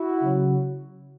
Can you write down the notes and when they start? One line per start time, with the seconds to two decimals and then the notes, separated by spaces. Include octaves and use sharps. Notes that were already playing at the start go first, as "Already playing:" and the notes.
Already playing: E4 F#4
0.20 C#3 F#3